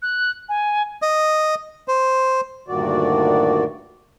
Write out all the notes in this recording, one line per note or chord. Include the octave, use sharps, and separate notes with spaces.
F#6
G#5
D#5
C5
D2 G2 A#2 D#3 F#4 D5